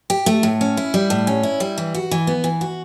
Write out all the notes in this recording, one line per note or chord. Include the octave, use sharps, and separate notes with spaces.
G4
A3
A2
C#4
E4
G3
A2
C#4
E4
G3
E3
F#4
E3
B3
E3
F#4